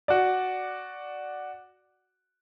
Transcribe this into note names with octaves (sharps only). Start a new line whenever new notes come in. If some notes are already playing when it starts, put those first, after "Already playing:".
F#4 D5